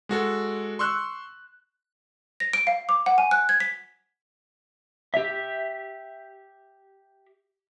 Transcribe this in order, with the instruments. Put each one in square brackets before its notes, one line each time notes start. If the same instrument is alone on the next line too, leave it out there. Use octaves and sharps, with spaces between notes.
[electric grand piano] G#3 F#4 A4
C6 C#6 E6 F#6
[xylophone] A#6
D7
F5
D6
F#5
G#5
F#6
G#6
B6
[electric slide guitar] G4 E5